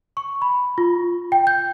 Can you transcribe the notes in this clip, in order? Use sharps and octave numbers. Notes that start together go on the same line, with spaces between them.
C#6
B5
F4
G5
G6